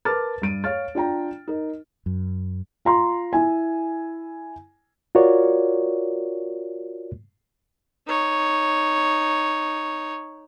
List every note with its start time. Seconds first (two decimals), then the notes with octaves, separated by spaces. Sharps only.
0.05 A#4 B4 A5 D6 F6 A6
0.42 G2 D7 D#7
0.64 C#5 F5 F6 A6
0.95 D4 F4 G5 A#5
1.48 D#4 A#4
2.06 F#2
2.85 F4 A#5 C6
3.33 E4 G#5
5.15 F4 F#4 A#4 C#5 D5
8.07 D#4 C#5